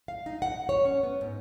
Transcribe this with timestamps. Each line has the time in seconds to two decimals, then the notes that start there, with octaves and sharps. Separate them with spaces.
0.08 F5
0.26 D#4
0.42 F#5
0.69 C#5
0.85 C#4
1.03 B3
1.21 G#2